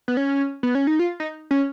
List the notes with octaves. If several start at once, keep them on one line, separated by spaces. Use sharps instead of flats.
B3
C#4
B3
C#4
D#4
F4
D#4
C#4